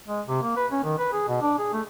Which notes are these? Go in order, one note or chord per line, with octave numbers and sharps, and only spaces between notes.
G#3
C3
A#3
B4
C#4
D#3
B4
G#4
B2
D4
G#4
A3